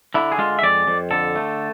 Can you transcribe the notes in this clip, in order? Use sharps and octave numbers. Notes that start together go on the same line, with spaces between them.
D3 E4
G#4
G#3 F4
E5
F2 D5
F2
D3 A4
A3